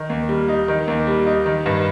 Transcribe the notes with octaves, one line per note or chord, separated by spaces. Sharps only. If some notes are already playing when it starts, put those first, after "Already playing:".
Already playing: D#3
D#2
G3
D#4
D#3
D#2
G3
D#4
D#3
G2